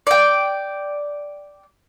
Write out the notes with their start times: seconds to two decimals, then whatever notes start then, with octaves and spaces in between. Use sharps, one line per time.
0.07 D5 G5